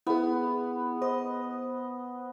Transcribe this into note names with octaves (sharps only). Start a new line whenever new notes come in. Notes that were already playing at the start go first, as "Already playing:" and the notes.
B3 E4 G#4
C5 D#5